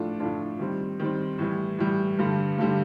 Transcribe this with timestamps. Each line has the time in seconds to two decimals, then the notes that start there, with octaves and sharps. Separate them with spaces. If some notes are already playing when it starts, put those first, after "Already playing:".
Already playing: A2 F3 A3 D4 F4
0.19 A2 F3 A3 D4 F4
0.59 D#3 G3 C4
0.99 D#3 G3 C4
1.38 A2 E3 G3
1.78 A2 E3 G3
2.19 G2 D3 G3
2.58 G2 D3 G3